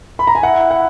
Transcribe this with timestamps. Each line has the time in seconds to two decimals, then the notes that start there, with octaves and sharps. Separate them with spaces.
0.19 B5
0.27 A#5
0.35 G#5
0.43 E4 F#5
0.71 F#5